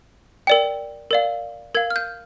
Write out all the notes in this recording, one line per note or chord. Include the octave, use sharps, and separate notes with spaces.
A#4 D5 G5
A#4 D5 F5
A#4 F5 G#6
F6
G6